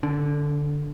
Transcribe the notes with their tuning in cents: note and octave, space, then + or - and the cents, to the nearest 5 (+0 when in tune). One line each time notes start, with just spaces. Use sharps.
D3 +0 D4 -35